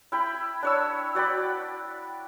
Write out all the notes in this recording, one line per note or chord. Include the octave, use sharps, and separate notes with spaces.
E4 G5 B5
D4 C#5 E6
F#4 D5 G5 B5